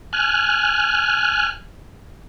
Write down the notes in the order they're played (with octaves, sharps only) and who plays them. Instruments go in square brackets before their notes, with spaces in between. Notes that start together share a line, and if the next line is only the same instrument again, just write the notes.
[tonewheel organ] G#5 F6 F#6